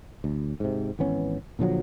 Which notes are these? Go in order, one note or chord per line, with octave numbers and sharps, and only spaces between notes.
D2
G#2 C3
G#1 E3 B3 C#4
A#2 D3 F3 F#3